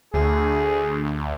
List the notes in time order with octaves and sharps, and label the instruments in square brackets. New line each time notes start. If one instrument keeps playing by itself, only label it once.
[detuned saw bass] D2 [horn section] G#4